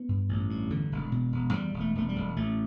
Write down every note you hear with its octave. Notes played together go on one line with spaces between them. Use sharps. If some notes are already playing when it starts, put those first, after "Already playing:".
Already playing: B3
G2
A1
G2
E2 D3
E1
B2
E1
E2 G3
E1
A3
E1 A3
G3
E1
A1 A3